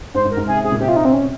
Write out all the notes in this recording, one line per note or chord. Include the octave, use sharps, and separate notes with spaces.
G#2 C5
G#2
A#4
G#2
C3 G#4
G#2 G#4
A#2
C3 G4
F4
D#4
C4
C#4